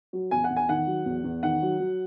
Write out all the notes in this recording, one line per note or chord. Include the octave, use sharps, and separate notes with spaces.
F#3
E2 G#5
F#5
E2
G#5
D#3 F#5
F#3
E2
E2
D#3 F#5
F#3
F#3